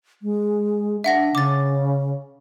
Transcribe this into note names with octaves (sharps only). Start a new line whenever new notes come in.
G#3
D4 E5 F#5 A#6
C#3 D6 A6